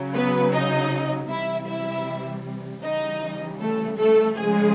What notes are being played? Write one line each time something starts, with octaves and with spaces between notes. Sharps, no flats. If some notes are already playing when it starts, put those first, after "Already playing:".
Already playing: C#3 F#3
B3 B4
D#4 D#5
C3 E3 G3 E4 E5
E4 E5
C#3 E3 G3 D#4 D#5
A3 A4
A3 A4
C#3 F3 G#3 G#4